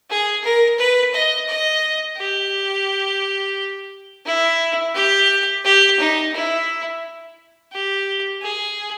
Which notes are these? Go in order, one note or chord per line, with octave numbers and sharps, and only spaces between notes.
G#4
A#4
B4
D#5
D#5
G4
E4
G4
G4
D#4
E4
G4
G#4